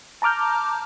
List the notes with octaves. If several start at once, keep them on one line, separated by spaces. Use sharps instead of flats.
A5 A#5 D6 F6 G6